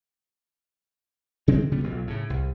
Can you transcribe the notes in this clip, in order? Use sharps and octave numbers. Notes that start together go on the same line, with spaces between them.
C#3 E3 G#3 C4
C#3 F3 G3 B3
B1 A#2
A2 C#3
C2